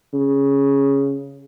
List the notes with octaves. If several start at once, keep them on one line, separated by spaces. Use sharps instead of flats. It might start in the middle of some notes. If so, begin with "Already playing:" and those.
C#3